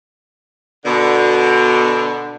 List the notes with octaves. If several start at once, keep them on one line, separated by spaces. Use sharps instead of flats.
B2 D3